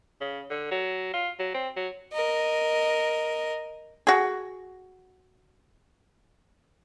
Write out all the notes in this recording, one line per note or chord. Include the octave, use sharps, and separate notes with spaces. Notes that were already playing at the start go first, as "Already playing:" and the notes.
C#3
D3
F#3
F4
F#3
C4
F#3
A#4 D#5
F#4 G#4